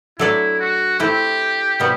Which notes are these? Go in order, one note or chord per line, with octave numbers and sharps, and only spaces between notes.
F#3 A3 D4 E4 A4 D5
F#4
A3 C4 E4 G4
C3 G3 B3 F#4